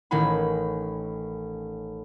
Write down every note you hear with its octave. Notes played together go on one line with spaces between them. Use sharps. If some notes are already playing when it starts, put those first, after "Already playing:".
A1 D#3 C#4 D#4 B5